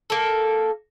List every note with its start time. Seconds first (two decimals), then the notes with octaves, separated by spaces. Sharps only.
0.10 A#3 A4